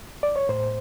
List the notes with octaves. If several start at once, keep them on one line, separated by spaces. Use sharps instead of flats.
D5
C#5
A2 C5